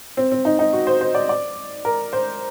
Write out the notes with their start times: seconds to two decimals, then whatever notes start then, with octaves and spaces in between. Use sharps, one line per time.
0.17 C4
0.32 C4
0.45 D#4
0.59 D#4
0.73 F#4
0.87 C5
1.01 C5
1.15 D5
1.29 D5
1.85 A#4
2.13 C5